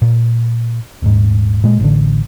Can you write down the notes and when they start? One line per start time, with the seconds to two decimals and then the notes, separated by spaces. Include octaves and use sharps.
0.02 A#2
1.02 D#1 G#2
1.64 A#2 G#3
1.80 A1 D3